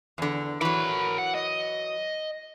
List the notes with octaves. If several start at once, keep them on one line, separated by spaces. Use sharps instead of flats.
E2 D3
E3 F#3 A#4 B5
F#5
D#5